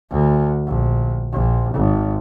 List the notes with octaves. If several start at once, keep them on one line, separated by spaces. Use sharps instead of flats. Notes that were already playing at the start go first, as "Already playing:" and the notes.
D2
A#1
A#1
G#1